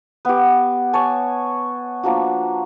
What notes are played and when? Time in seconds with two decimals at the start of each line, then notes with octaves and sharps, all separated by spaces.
0.25 B3 G4
0.93 C#5 G#5 A5
2.03 F3 A#3 D4 F#4